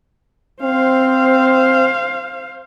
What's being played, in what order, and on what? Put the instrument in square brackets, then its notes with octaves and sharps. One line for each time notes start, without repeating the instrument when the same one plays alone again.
[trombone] C4 [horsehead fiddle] C5 F5